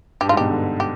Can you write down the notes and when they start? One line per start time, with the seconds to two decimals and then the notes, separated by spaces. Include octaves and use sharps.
0.21 G2 G4
0.29 G#2 F4
0.37 B2 G4
0.50 D3
0.80 G4